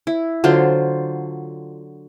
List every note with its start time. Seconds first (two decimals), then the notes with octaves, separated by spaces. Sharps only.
0.07 E4
0.44 D3 F#3 F4 C5